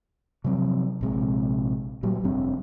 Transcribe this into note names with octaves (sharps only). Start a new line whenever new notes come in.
C3 F3 F#3 C4
A#1 C3 G#3
A#2 F#3 G3
F1 G2 C4